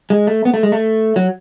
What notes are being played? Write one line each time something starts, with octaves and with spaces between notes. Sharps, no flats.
G#3
A3
B3
A3
G#3
A3
F#3